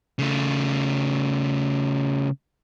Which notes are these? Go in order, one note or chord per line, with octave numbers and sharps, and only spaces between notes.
C#3 A3